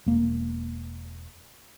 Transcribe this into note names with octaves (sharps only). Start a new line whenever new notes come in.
E1 A#3